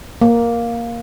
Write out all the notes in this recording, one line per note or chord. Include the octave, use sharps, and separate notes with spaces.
A#3